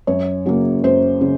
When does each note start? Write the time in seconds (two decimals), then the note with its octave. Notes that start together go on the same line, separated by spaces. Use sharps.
0.07 F#2 C#5
0.46 C#3 F#3 A#3
0.83 F#2 C5
1.21 C#3